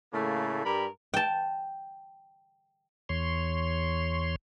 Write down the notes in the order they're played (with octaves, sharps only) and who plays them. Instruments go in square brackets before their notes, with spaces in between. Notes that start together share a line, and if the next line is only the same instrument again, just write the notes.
[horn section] A2 C#3 A3 A#3
G2 G3 A#4 B5
[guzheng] G5 A5
[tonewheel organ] E2 C#5 C6